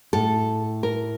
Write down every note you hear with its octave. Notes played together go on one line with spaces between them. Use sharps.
A2 A4
A#4